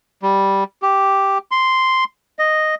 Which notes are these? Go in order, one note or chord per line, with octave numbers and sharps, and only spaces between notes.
G3
G4
C6
D#5